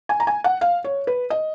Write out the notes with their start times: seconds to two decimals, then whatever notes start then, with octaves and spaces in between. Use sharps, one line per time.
0.09 G#5
0.20 A#5
0.27 G#5
0.44 F#5
0.61 F5
0.84 C#5
1.07 B4
1.30 D#5